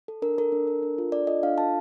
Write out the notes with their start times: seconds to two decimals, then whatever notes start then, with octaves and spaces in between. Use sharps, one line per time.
0.08 A4
0.22 D4 A#4
0.38 A4 A#4
0.52 D4
0.67 A4
0.83 D4
0.98 F4 A4
1.12 D4 D5
1.27 F4 A4 D#5
1.43 D4 F5
1.58 F4 A4 A5